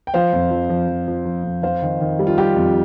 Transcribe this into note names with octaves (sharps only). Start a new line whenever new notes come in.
G5
F3 C5 F5
F2
F3
F3
F3
F3
F3
F2
F2 C5 F5
D#3
D#3
G3
F4
G3 G4
F2